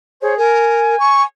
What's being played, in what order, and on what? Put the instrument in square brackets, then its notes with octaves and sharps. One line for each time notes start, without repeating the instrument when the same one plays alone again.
[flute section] G#4 C5 C#5
[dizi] A#4 [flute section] G#5
[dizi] C#6